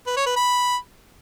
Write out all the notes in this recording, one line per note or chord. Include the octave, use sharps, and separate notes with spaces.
B4
C#5
B4
B5